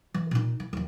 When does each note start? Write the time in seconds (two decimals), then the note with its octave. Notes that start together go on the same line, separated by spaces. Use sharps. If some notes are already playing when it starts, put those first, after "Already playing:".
0.14 E3
0.31 A#2 D#4
0.60 E3
0.73 D#2 F3